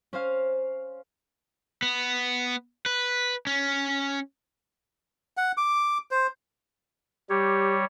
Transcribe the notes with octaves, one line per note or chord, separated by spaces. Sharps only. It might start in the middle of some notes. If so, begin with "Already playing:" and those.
C#4 C5 F5
B3
B4
C#4
F#5
D6
C5
G3 G4 C#5